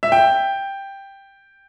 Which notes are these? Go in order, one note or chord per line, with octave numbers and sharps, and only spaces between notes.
E5
G5